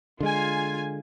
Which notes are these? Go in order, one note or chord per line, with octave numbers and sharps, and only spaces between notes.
D3 G#3 F4 G#5